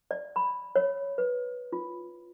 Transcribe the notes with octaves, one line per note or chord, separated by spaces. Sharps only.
D5
B5
C#5
B4
F4